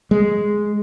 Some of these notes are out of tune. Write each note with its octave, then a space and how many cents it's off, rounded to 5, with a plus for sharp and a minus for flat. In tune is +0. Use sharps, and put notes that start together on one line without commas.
G#3 +0